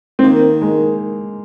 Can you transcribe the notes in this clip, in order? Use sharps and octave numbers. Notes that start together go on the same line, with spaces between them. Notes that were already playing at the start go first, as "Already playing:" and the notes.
C4
D#3 A#3
G#3